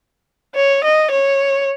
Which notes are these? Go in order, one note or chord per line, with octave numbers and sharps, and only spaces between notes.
C#5
D#5
C#5